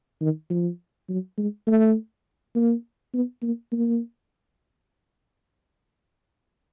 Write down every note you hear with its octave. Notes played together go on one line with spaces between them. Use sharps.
D#3
F3
F#3
G#3
A3
A#3
B3
A#3
A#3